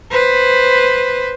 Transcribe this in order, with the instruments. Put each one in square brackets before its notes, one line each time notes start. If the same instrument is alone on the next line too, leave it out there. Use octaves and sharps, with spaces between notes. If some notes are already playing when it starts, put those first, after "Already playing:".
[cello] B4 C5